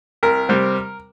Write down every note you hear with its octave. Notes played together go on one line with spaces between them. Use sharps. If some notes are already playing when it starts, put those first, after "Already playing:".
C2 A#4
C3 G3 C4